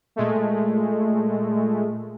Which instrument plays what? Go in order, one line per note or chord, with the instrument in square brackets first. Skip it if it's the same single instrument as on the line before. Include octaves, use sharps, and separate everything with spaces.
[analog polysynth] A#2 G#3 A3